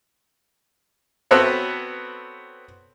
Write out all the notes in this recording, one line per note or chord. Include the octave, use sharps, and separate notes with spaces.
B3 C4 F#4 A4 B4 C#5